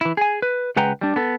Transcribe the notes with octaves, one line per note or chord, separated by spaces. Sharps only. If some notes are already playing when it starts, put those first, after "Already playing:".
E3 E4
G#4 G#5
B4
C#2 G#3 B4 F#5 G5 A#5
G3 D4
B3 A4